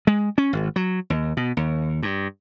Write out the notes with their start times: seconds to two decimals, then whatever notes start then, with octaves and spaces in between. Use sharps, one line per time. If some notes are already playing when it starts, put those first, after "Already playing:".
0.07 G#3
0.38 C#4
0.53 G#1
0.76 F#3
1.10 D#2
1.37 B2
1.57 D#2
2.03 G2